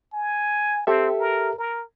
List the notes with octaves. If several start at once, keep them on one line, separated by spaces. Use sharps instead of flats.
G#5
C4 G4 A4 E5
A#4
A#4